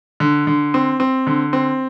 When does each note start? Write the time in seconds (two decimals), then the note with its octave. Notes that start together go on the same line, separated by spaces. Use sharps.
0.20 D3
0.47 D3
0.74 C4
1.00 C4
1.27 D3
1.53 C4